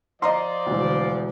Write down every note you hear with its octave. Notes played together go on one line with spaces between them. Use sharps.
F3 C5 D5 D#5 A#5 C6
E1 D2